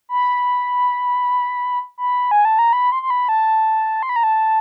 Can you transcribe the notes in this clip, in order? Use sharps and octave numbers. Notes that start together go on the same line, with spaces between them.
B5
B5
G#5
A5
A#5
B5
C6
C6
B5
A5
C6
B5
A#5
A5